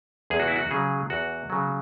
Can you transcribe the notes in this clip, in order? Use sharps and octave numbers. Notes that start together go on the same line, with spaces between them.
E2 G#4
F#4
E4
F#4
C#3 F#3 G#4
E2 F#4
C#3 F#3